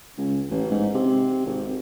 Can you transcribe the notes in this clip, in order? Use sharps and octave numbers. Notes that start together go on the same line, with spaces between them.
C#2
A1
G#2
C3
G#1